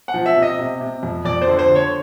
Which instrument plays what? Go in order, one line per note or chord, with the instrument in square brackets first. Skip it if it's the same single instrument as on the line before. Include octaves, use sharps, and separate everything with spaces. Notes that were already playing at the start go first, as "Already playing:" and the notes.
[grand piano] F#5
F3
E5
C3
D#5
C3
C3
F2
F2 D5
C5
D3
C5
D3
C#5